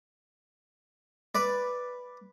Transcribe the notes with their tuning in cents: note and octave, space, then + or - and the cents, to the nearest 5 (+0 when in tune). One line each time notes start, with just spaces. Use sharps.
B4 +0 D5 +0